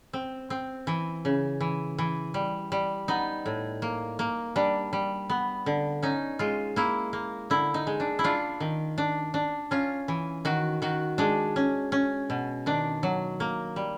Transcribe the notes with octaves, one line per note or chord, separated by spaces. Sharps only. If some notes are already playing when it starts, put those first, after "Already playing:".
C4
C4
E3
C#3
E3
E3
G3
G3
B3 D#4
A2
A#3
A#3
G3 D4
G3
B3
D3
C#4 D#4
G#3 F4
A#3 E4
A#3
D3 E4
D#4
G#3
D4
E4
D4 F4
D#3
D4
D4
C#4 F4
E3
D#3 F#4
D#3 F#4
G#3 D4
C#4
C#4
B2
D#3 D4
F#3
A#3
G3